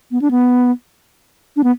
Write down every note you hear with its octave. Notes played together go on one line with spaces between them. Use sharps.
B3
D4
B3
D4
B3